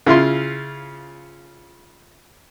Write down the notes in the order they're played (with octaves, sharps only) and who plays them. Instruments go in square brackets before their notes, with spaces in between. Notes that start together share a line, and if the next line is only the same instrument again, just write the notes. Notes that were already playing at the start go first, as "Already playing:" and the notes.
[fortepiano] C#3 E4 F4 C6